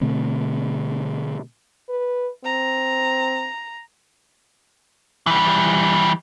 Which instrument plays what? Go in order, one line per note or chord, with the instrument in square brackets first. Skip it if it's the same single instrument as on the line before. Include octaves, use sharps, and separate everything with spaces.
[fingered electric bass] B2 D3 A3 C4
[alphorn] B4
[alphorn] C4 [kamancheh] A#5
[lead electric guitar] E3 G3